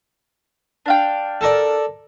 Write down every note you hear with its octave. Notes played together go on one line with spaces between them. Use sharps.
D4 F5 G5
A4 A#4 D5